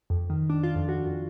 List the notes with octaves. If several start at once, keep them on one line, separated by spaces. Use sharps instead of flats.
F2
D#3
D4
F4
F2
F#4
F2